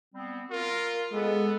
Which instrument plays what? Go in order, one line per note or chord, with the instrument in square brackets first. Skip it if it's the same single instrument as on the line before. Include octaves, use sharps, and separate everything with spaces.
[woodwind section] G3 B3 C4
[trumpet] F4 [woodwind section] A#4
[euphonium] G#3 [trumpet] B3 [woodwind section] A4